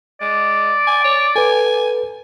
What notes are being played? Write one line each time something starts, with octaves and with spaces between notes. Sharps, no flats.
G#3 D5
G#5
C#5
A4 B4 G#5